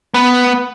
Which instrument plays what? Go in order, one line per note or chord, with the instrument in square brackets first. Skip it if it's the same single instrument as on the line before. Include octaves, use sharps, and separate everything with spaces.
[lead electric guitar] B3